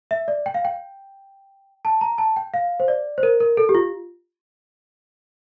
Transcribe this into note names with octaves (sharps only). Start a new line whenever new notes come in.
E5
D5
G5
F5
G5
A5
A#5
A5
G5
F5
C5
D5
C5
A#4
A#4
A4
G4
F4